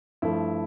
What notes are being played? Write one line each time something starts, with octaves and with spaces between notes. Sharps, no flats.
G2 F3 A3 E4